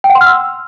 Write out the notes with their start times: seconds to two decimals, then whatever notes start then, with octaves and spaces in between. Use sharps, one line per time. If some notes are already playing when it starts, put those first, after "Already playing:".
0.04 G5
0.10 F#5
0.15 C6
0.21 F6
0.26 E6